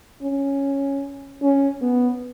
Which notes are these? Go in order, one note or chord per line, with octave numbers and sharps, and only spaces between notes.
C#4
C#4
B3